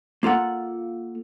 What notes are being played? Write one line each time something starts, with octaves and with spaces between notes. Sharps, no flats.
A#3 F4 A4 F#5